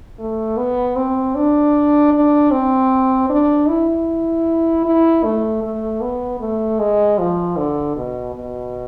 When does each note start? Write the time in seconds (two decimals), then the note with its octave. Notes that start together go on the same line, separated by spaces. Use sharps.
0.19 A3
0.57 B3
0.96 C4
1.35 D4
2.13 D4
2.51 C4
3.30 D4
3.69 E4
4.85 E4
5.24 A3
5.63 A3
6.01 B3
6.40 A3
6.79 G#3
7.19 F3
7.57 D3
7.96 B2
8.35 B2